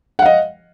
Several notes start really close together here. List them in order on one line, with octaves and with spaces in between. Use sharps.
F#5 F5 D#5